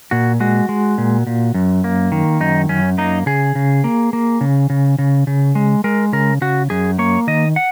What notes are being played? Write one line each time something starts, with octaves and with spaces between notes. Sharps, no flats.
A#2 F#4
G#3 F#4
G#3
A#2
A#2
F#2
A#3
D#3
F#2 D#4
F#2 C#4
A#3 D#4
C#3 G#4
C#3
A#3
A#3
C#3
C#3
C#3
C#3
G#3
G#3 A#4
C#3 A#4
C#3 F#4
F#2 G#4
A#3 C#5
D#3 D#5
F#5